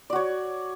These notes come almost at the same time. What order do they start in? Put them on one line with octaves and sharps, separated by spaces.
D5 F#4 C#5